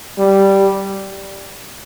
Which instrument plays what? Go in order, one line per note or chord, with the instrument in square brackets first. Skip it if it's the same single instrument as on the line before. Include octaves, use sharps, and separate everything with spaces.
[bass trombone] G3